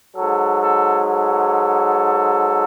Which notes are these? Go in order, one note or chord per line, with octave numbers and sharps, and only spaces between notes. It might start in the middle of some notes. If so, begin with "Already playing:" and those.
G#2 F#3 A4
A4
A4